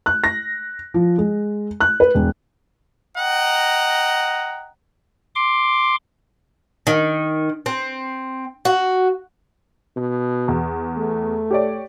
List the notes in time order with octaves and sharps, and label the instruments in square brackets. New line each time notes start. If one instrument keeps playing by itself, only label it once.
[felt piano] F#6
A#6
F3
G#3
F#6
B4
E1
[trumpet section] D#5 F#5 G5 A#5
[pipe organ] C6 D6
[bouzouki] D#3
C4
F#4
[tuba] B2
[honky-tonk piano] E2
[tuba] A3
[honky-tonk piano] G4 C#5 D5